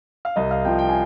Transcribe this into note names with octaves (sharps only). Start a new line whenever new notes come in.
F5
C2 D#5
F5
C3 F3 G5
G5
G#5